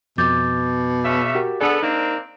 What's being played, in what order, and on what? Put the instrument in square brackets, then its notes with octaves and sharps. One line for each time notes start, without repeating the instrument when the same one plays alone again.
[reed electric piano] F2 [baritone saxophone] B2 [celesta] D6 G6 A6
[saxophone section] C#3 C#4 E5
[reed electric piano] F#4 G4 A#4
[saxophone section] B3 A4 [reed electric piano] D4 G#4 D5
[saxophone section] A#3 C4 D4 [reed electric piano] D#4